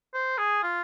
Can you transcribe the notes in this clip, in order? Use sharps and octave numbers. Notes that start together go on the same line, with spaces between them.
C5
G#4
F4